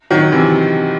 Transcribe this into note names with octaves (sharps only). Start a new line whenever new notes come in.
D#3 F#3
C3 E3